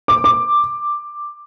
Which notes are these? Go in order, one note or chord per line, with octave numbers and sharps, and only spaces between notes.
D6
D6